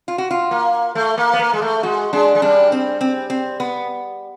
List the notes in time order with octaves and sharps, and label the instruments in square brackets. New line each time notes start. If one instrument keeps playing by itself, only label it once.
[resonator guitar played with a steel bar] F4
F#4
F4
[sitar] A#3
A3
A#3
B3
A#3
G#3
A3
[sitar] G#3 [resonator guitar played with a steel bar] F#4
[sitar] G#3 [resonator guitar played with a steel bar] D4
[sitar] G#3
[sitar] G3 [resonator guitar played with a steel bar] D4
[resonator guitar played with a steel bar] C4
C4
C4
B3